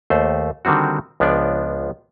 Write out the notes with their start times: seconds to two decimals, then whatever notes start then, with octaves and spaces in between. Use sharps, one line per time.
0.10 D#2 A3 C5
0.65 D3 D#3 G3 C4 F#4
1.20 C#2 F3 B3 D4 D5